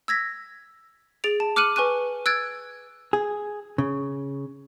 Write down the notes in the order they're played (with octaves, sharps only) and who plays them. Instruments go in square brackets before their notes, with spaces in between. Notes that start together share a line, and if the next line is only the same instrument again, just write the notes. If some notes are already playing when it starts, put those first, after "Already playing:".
[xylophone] E6 G#6 A#6 B6
G#4 A6 D7 F7
A5
D6 F6 F#6 C#7 D#7 F#7
B4 G#5 C#6 F#6 D#7
E6 F#6 G#6 A6 D7
[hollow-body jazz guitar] G#4
C#3